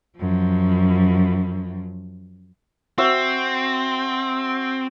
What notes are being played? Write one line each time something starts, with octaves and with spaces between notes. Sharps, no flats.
F#2 F3
C4 F#4 C5 E5